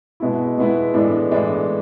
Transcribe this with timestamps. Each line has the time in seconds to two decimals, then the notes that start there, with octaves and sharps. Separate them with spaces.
0.20 B2 G#3 B3 E4
0.58 B2 G#3 B3 E4
0.94 A2 E3 G#3 B3 D4
1.31 A2 E3 G#3 B3 D4